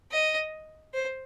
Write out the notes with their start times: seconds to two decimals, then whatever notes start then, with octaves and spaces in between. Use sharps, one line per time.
0.12 D#5
0.94 C5